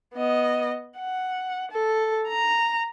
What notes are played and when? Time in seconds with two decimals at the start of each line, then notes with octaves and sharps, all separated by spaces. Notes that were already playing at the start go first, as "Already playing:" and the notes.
0.14 B3 D#5
0.98 F#5
1.71 A4
2.28 A#5